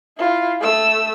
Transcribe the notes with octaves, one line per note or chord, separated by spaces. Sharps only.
E4 F4
A3 E6